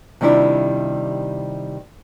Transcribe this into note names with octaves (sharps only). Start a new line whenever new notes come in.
C3 D#3 G3 D4 E4 F4